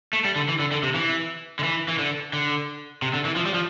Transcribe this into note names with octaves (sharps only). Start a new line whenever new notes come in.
A3
G3
D3
E3
D3
D3
C3
E3
D3
E3
E3
D3
D3
C3
D3
E3
F3
G3
F3